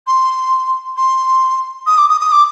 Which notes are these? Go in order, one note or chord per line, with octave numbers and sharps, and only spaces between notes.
C6
C6
D#6
D6
D#6
D#6
D6